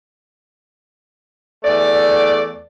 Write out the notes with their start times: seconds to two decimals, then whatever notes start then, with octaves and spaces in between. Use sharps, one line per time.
1.64 E2 A3 D5